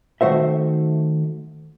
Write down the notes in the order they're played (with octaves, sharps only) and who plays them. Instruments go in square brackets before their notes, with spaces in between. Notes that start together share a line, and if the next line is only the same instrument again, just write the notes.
[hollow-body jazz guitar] D#3 A3 F#4 C5 E5